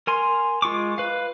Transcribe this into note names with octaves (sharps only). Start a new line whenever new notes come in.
A#4 G#5 C6
G#3 F4 C#6 D6
B4 F5